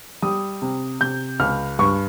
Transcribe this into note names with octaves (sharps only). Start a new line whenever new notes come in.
G3 D#6
C3
C3 G6
C#2 F6
G2 C#6